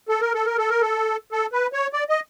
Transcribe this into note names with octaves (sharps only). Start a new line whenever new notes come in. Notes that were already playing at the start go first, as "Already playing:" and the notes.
A4
A#4
A4
A#4
A4
A#4
A4
A4
B4
C#5
D5
D#5